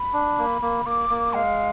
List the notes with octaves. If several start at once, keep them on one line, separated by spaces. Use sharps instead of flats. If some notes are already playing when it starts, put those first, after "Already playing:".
Already playing: B5
D4
A#3
A#3
A#3 D6
A#3
G#3 F5